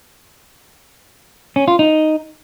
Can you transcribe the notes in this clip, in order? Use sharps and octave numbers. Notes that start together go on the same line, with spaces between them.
C#4
F4
D#4